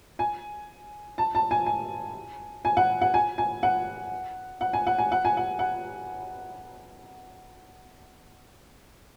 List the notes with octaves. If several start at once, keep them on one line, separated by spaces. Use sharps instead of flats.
G#5
A5
A5
G#5
G#5
G#5
F#5
F#5
G#5
G#5
F#5
F#5
G#5
F#5
G#5
F#5
G#5
F#5
F#5